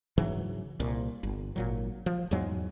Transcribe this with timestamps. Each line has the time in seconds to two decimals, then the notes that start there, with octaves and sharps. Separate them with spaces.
0.18 G#2 C#3 E3 F#3
0.80 C2 A#2
1.23 G1
1.56 G#1 A#2 F#3
2.06 F3
2.31 E2 G#2 F#3 G#3